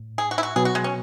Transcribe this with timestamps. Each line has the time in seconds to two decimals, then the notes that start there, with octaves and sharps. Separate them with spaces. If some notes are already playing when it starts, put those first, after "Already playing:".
Already playing: A2
0.18 G#4
0.31 F#4
0.38 E4
0.43 F#4
0.56 B2 F#3 B3 G#4
0.65 F#4
0.75 G#3
0.84 C#4